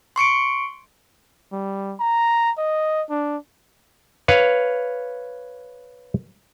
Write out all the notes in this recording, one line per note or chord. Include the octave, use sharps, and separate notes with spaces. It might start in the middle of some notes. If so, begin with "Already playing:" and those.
C6 C#6 C#7 D7
G3
A#5
D#5
D4
B4 C#5 F5